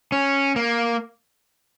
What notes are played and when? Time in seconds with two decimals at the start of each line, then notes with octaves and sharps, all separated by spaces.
0.12 C#4
0.56 A#3